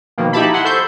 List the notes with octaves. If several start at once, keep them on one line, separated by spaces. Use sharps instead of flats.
B2 D#3 F3 A#3
D#4 E4 G4 E5 A5 B5
F#5 G#5 B5 C6
A4 C5 E5 C6 C#6 G6